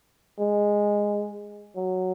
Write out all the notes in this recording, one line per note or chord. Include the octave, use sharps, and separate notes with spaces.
G#3
F#3